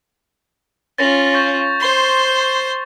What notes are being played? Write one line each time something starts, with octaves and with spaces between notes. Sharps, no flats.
C#4 F4 A6 A#6 F7
C#6 G6 A#6
C5 C6